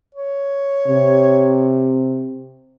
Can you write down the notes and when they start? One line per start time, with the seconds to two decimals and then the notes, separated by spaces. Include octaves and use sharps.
0.14 C#5
0.89 C3